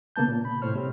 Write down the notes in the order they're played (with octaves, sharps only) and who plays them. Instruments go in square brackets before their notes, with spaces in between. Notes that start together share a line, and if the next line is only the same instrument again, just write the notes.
[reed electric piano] C#3 A#3 B3 A5 G6
A#2
B5
A2 C3 C5 C#5 F6
C3 C4